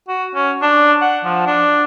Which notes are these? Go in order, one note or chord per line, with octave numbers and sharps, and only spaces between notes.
F#4
C#4
D4
F#5
F3
D4